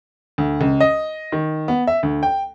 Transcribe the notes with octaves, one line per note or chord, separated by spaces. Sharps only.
D2
C#2
D#5
D#3
B3
E5
D2
G5